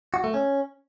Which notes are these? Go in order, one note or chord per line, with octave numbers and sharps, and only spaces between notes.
F#4
A3
C#4